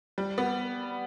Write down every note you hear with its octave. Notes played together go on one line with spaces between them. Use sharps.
G3
B3